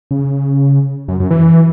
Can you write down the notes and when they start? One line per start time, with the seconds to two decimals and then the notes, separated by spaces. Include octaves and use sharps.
0.11 C#3
1.08 F#2
1.20 F#2
1.31 E3